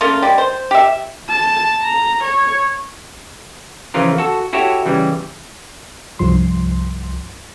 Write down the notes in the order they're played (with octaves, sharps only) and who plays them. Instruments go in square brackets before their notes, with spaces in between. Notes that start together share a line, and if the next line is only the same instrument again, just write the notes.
[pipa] C#3 A3 A#3 F4
G3 G#3
C5
G4 E5
[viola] A5
A#5
C#5
[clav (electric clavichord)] C#3 E3 F3 F4 A#4
F#4 A4
E4 F#4 G4 A4 C#5 E5
C#3 E3 G3
[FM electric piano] C2 G2 F3 C6